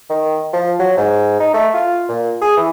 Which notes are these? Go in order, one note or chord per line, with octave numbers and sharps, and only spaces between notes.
D#3
F3
F#3
G#2
D#4
A3
F4
A#2
G#4
E3